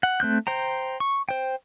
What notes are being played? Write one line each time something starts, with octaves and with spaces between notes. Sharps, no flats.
F#5
A3 C4 F#6 G6
C5 G5 A#5
C#6
C5 G5